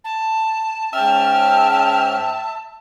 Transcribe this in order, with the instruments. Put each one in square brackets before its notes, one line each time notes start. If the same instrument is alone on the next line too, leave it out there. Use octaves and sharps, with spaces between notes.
[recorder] A5
[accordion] G#2 C#4 F6 [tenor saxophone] E5 [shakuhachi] G5 [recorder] A5